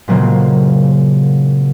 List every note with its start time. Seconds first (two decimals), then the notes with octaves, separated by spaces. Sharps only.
0.08 A#2 C#3 F#3 G#3 A#3 C4